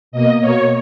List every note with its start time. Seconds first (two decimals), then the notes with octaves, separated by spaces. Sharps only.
0.12 B2 A#3 D#5
0.40 B2 A#3 C#5